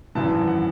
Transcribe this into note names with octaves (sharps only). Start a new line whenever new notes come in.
G#1 F#2 E3 A5
F#5